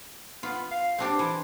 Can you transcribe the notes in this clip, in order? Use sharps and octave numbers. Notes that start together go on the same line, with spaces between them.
B3 F4
F5
C4 D4 G4 C5
E3